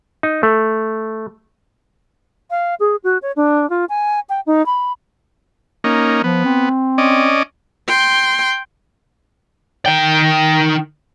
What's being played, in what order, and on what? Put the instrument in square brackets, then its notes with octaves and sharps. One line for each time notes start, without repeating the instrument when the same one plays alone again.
[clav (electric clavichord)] D#4
A3
[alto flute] F5
G#4
F#4
C#5
D4
F4
G#5
G5
D#4
B5
[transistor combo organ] A#3 C#4 D#4
[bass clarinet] F3 [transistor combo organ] B3
[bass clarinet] C4
[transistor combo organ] C#4 D5 D#5
[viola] G5 C6
[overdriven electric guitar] D#3 G5